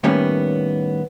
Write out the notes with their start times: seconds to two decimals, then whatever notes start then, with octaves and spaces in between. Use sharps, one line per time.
0.03 A2 D#3 G3 A#3 B3 C#4